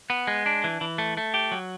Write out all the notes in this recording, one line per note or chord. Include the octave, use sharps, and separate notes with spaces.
B3
G#3
D4
E3
E3
A3
A3
G4
F#3